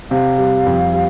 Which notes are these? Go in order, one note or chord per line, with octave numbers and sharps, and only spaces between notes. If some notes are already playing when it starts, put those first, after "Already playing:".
C3 F5
G3
F2
G3